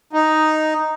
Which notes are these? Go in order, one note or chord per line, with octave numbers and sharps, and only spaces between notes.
D#4